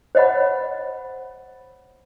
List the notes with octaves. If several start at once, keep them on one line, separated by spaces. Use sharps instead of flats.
C5 C#5 D#5 F#5 B5